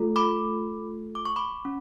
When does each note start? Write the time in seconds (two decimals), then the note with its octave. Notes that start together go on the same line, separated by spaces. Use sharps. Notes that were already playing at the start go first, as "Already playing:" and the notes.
Already playing: A3 F4 A4
0.16 B5 D6
1.15 D6
1.25 C#6
1.36 B5 D6
1.65 C#4